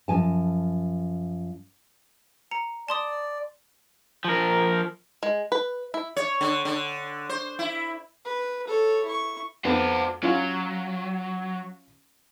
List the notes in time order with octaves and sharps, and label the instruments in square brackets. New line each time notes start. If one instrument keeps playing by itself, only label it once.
[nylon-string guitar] F#2 F3 G#5 A5
[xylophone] A#5 C#7
[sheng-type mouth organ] D5 [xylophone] A5 C6 D#6
[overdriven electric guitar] F3 A#4
[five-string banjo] G#3
B4
E4
[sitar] C#5
D3
D3
C5
E4
[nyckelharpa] B4
A4 C#5
E4 C#6
[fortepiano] F2 B3 [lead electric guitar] F#4 C5
[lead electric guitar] F#3 [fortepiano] C#4 F4